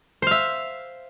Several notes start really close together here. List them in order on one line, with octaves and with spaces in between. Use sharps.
C5 F5 E5